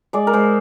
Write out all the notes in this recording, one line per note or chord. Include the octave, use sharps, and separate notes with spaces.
G#3 D5
A#4
G#3 C5